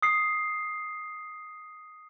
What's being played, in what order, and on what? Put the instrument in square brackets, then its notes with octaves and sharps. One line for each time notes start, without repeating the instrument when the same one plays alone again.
[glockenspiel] D#6 C7